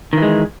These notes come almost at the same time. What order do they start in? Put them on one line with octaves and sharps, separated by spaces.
D#3 E3 G#3